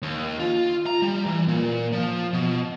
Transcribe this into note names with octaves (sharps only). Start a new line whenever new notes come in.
D#2
F4
A#5
G3
E3
A#2
F3
B2